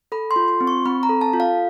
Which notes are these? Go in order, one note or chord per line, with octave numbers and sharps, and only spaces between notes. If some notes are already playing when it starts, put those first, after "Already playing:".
A4 B5
C6
F4
C6
C4
C#6
C4 B5
A#5
A4
A5
F4
F5